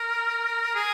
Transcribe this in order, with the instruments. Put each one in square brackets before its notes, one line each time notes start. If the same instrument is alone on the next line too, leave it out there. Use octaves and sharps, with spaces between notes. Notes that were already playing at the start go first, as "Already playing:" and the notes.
Already playing: [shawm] A#4
G#4